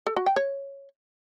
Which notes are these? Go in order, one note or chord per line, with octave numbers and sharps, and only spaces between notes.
A4
F#4
G5
C#5